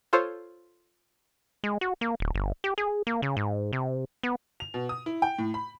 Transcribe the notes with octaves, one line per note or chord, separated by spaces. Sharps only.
F4 A4 C5 C#5
G#3
F#4
A#3
D1
G1
G4
G#4
A#3
C#3
G#2
C3
B3
F7
B2
D#6
E4
G5
A2
B5